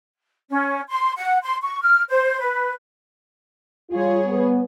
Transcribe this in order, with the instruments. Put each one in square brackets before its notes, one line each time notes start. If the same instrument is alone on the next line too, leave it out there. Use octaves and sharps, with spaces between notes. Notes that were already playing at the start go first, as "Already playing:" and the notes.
[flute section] C#4
C6
F#5
C6
C#6
F6
C5
B4
[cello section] G3 G#4 C#5 [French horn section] F4
[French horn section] B3